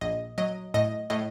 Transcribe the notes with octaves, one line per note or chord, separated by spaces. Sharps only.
A#1 D#5
F#3 D#5
A2 D#5
A2 D#5